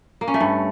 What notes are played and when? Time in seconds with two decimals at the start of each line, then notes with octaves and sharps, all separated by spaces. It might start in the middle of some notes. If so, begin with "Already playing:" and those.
0.21 A#3
0.28 C#4
0.34 A3
0.40 G2